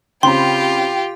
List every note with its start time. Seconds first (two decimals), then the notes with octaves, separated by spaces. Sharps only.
0.23 C#3 C4 F4 G4 G5 B5 C6